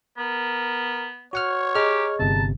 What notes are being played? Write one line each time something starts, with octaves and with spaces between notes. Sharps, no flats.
B3 A#4
F#4 C#5 F#5 F6
G4 G#4 D#5 A#5 F6
G1 C3 A5